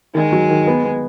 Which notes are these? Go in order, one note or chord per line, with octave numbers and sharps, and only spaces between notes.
D#3 G#3
F#3
D#3
B3
B3